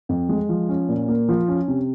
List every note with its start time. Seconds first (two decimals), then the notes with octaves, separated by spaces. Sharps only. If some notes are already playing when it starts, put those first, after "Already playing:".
0.09 F2
0.29 G#3
0.49 F3
0.69 C#4
0.89 A#2
1.08 A#3
1.29 F3
1.48 C#4
1.68 C3